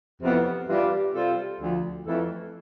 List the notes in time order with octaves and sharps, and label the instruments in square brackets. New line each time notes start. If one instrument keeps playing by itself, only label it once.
[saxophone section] F2 C3 E3 B3
G2 E3 G3 D4 F4
C3 G3 C4 F4 A4
D2 D3 F3
F2 E3 A3 E4 A4